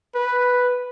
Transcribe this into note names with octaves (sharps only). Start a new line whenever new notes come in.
B4